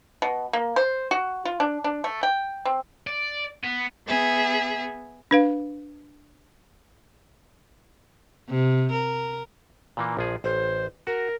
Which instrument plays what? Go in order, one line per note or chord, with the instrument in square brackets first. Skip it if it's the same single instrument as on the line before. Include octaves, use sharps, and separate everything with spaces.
[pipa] B2
A#3
C5
F#4
F4
D4
D4
A3
G5
C4
[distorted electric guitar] D5
B3
[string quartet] B3 G#4 E5
[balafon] D4 B4 F5
[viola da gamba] C3
A#4
[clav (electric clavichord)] A#2 E3 A#3
A#1 F3 G#4
[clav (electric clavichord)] A1 [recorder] C5
[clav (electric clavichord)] F#4 [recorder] A#4